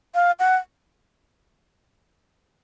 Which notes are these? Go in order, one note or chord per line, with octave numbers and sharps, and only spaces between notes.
F5
F#5